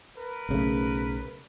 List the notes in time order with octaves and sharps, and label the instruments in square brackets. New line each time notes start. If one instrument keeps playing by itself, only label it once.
[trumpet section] A#4 B4
[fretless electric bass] B1 C#3 A3